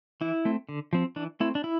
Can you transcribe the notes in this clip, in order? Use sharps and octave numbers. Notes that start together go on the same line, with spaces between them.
E3 E4
A3 C4
D3
F3 C4
E3 D4
A3 C4 E4
D4
E4